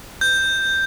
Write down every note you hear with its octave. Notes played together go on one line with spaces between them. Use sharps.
G6